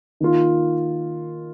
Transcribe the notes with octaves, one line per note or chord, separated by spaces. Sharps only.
D#3 A#3 F4